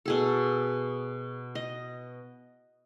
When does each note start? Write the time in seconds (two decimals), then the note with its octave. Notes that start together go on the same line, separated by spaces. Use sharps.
0.06 B2 G#4 A4
1.55 D#5